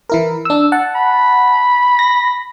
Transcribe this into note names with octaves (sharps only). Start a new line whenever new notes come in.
E3 E4 A#4
D4 E6
F#5 A5
B5
A#6